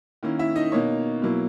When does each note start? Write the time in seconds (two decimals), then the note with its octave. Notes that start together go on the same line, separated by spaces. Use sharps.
0.23 D#3 A#3 C#4 E4
0.39 E4 E5
0.55 D#4 D#5
0.72 B2 A#3 D#4 C#5
1.22 B2 F#3 A#3 E4